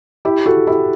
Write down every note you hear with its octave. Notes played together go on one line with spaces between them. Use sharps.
E4 G4
F#4 A4
E4 G4